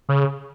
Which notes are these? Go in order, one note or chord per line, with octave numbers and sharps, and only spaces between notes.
C#3